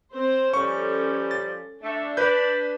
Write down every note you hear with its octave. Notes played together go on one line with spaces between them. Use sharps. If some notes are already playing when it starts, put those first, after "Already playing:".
C4 C5
F3 G3 C#4 A4 C#6
A6
A3 D4
B4 D5 A5 B5 G6